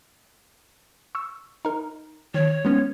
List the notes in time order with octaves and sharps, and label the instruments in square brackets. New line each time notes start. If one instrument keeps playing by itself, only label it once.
[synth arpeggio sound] C#6 E6
D#4 A#4
[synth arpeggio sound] D#3 [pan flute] C#5
[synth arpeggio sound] G#3 B3 C#4